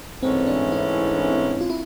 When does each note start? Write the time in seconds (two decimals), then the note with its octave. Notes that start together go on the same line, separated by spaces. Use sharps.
0.23 G#2 E3 A3 C4 C#4
0.47 D4
0.72 E4
1.61 F4
1.70 E4